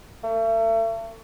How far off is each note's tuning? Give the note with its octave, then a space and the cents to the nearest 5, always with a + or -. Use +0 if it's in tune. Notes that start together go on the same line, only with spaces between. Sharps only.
A3 +40